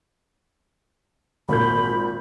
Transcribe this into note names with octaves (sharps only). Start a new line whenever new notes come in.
G#1 A#2 B5 G6